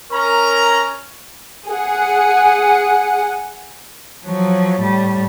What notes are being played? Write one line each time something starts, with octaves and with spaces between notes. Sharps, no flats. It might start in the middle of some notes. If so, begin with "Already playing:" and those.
C#4 A#4 A#5
G#4 F#5
F3 F#3
A2 G3